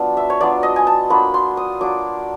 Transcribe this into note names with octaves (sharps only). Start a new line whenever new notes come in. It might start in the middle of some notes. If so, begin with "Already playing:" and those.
Already playing: F#3 B3 D4 F4
E5
C#5
F#3 B3 D4 F4 D5
D#5
G#5
A5
F#3 A#3 D4 F4 B5
C6
D#6
F#3 A#3 D4 F4 D6